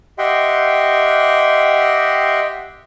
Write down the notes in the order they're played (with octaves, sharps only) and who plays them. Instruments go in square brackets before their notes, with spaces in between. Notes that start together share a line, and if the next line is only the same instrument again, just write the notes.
[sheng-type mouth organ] G4 D#5 E5 F#5 G5 C6